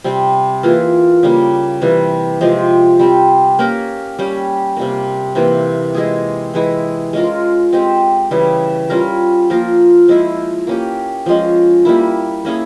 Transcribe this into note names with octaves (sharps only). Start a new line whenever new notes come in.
C3 G3 C4
E3 A#3 F4 G#4
C#3 G3 A#3
C3 E3 G3
C3 F3 G#3 C4
G3 C4 G4
A#3 C#4 G4 A#4
G3 C#4 G4
C3 G3 A#3
C3 E3 A#3
G#3 E4 G#4
E3 G#3 E4 G#4
G#3 C#4 F4 A#4
G#3 C4 G4
C#3 E3 G3
G3 C#4 F4 A#4
F3 A#3 F4 A#4
F3 G#3 E4
A#3 C#4 G4
F3 G#3 C#4
G3 A#3 E4
A#3 C#4 E4 G#4